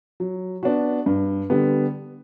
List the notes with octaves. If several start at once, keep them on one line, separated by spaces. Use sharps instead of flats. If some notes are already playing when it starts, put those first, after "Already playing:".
F#3
B3 D4 F#4
G2
D3 G3 B3